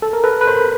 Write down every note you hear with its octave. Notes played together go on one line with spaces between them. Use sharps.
A4
A#4
A4 B4
B4
A#4 C5